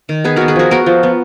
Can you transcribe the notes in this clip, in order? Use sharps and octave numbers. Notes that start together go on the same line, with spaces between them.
D#3
B3 G#4 B4
B3 F#4 A#4
G#4 B4
F3 F#4 A#4
B3 F#4 A#4
F3
B3